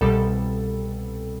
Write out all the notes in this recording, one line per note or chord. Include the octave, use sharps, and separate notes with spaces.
C2 B2 G3 A4